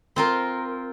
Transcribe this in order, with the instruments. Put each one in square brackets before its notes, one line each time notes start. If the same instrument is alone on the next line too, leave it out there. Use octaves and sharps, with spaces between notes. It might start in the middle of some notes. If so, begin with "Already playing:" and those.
[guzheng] C4 F4 A#4